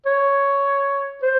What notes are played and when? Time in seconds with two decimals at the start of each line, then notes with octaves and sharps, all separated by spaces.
0.06 C#5
1.22 C5